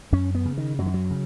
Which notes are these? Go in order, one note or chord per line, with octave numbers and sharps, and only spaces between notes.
F#2 C#4
B3
C#3
D#3
F#2 F#3
D#3
F#3
C#3